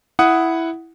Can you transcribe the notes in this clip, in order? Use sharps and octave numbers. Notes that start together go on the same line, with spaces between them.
E4 F#5 D#6